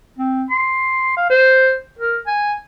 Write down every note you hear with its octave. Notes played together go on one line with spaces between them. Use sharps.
C4
C6
F5
C5
A#4
G#5